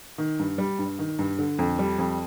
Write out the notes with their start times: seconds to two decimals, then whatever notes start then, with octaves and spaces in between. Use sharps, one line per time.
0.18 D#3
0.39 G2
0.58 G3
0.79 G2
0.99 D#3
1.19 G2
1.39 D3
1.59 F2
1.79 G3
1.98 F2